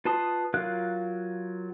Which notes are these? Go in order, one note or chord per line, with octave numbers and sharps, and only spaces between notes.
F4 B4 A5 C6 D#6
F#3 F4 A#4 F5 F#6